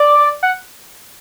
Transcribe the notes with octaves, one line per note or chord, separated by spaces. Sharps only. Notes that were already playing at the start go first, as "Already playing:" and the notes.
Already playing: D5
F#5